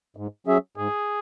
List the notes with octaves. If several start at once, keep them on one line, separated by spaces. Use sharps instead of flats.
G#2
F#3 C#4 G#4 E5
G#2 G#4